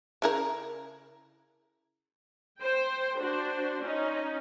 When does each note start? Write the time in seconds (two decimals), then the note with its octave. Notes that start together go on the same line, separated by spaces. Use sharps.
0.22 C#3 E4 A#4
2.59 C5 G5
3.19 D4 F#4 C5
3.82 C#4 D#4